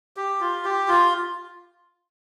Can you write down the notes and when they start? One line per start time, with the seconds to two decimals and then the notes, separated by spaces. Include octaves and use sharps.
0.17 G4
0.40 F4
0.65 G4
0.88 F4